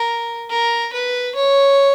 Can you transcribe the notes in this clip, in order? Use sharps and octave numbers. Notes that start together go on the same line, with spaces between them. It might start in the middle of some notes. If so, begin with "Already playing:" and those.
Already playing: A#4
A#4
B4
C#5